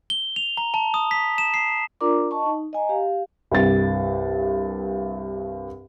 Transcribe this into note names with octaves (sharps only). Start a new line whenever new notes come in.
G7
F7
A#5
A5
D#6
B6
E7
C7
D4 F4 A#4 D5 A#5 D6
D#5 A5 C#6
D#4
D#5 G#5 A#5
G4 F5
C2 G2 A6